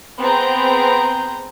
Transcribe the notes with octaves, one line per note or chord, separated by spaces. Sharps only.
B3 C4 G#4 A#5 G6